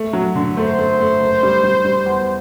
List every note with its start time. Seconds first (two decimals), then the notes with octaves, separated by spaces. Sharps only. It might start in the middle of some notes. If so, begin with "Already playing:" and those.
Already playing: A3
0.13 F#3
0.36 D3
0.57 A3 C5
0.79 A3
1.00 A3
1.20 F#1
1.43 G3
1.64 G3
1.85 G3
2.06 E2